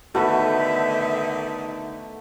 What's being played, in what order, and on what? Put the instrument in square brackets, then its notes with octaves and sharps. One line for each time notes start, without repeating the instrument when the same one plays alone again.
[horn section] D3 D#3 D#4 [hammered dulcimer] A3 B3 [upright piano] F#4 A4 [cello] E5